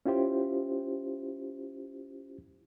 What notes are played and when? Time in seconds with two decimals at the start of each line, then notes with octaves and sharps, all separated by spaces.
0.06 C#4 E4 F4 G4 C5